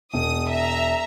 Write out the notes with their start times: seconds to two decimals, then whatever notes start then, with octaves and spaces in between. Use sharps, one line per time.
0.14 E1 D#6
0.49 E5 A#5